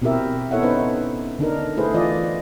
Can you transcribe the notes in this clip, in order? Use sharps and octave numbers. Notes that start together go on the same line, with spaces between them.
B2 C4 E4 G4 A#4 E5
B3 E4 A4 C#5 E5 F#5
B3 C#4 D#4 B4 C5
D3 D4 D#4 A#4
A3 E4 G#4 B4 C5
E3 F4 D5 D#5